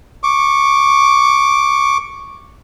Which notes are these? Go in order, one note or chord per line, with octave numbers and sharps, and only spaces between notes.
C#6 D6